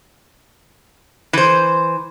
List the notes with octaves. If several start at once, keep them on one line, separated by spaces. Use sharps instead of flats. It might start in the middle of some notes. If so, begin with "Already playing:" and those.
E3 C5